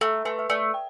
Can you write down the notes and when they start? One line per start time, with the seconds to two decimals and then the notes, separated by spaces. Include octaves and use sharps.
0.01 A3 A4
0.25 A3 B4
0.39 E5
0.50 A3 D5
0.74 G5